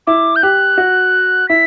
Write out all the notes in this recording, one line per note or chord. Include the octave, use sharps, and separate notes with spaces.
E4 D6
G6
G4 F#6
F#4
E4 B6